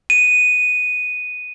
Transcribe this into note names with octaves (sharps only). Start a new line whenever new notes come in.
D#7